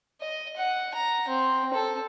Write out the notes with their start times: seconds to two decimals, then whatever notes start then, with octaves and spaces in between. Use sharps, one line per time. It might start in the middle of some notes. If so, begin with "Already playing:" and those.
0.21 D#5
0.56 F#5
0.95 A#5
1.28 C4
1.74 A4